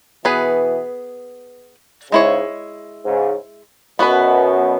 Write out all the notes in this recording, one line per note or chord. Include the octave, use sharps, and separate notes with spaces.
B2 E3 B3 G#4 B4
G#2 C#3 G#3 E4 C#5
G#2 C#3
F#2 B2 B3 F#4 B4